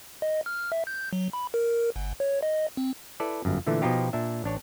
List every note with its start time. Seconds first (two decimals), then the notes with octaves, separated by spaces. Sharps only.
0.22 D#5
0.46 F6
0.72 E5
0.87 G6
1.13 F#3
1.33 B5
1.54 A#4
1.96 G1
2.20 C#5
2.43 D#5
2.77 C4
3.20 E4 A4 B4 D5
3.45 G1 F#2
3.67 A#2 D3 E3 A3
3.82 B2 F3 D#4 F4 G4
4.13 A#2 D4 E5
4.44 A1 D4 C#5